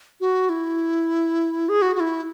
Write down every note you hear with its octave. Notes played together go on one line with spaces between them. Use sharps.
F#4
E4
G#4
F#4
F#4
E4